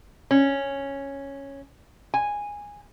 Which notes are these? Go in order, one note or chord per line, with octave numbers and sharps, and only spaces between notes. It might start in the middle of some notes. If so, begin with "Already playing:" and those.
C#4
G#5